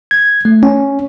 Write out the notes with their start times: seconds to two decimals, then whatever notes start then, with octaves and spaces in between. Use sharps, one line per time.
0.11 G#6
0.45 A3
0.63 C#4